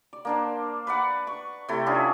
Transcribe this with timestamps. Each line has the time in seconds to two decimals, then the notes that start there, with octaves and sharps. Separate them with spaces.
0.13 D5
0.25 A#3 D4 C5
0.87 B4 D5 F#5
1.27 C#6
1.69 C3 A3 E4 A4
1.86 C#4 D4 F4 G#4